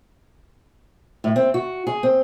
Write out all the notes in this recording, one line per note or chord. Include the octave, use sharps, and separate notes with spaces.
A2
C4
F#4
G#4
C4